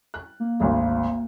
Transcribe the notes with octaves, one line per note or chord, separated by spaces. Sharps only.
F#6
A#3
G#1 D2